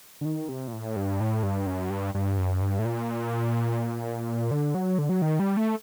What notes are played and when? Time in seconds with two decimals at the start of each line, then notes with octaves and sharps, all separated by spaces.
0.21 D3
0.25 D#3
0.49 C3
0.68 A#2
0.73 A2
0.96 G2
1.20 A2
1.43 G2
1.66 F#2
1.90 G2
2.14 G2
2.38 F#2
2.61 G2
2.79 A2
2.85 A#2
4.51 D3
4.75 F#3
4.98 D3
5.09 F#3
5.22 D#3
5.39 G3
5.57 A3